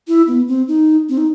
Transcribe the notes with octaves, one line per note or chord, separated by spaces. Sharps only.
E4
B3
C4
D#4
C4
D#4